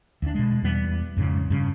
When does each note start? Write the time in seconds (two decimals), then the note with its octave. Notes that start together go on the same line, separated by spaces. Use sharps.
0.22 D2 D4
0.34 B2 G#3
0.63 E2 G3 B3
1.17 F2 G#2 C#3
1.50 G2 C#3